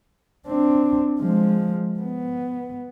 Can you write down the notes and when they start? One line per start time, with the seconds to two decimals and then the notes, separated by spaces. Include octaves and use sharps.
0.46 C4 D4
1.20 F3 G#3
2.00 B3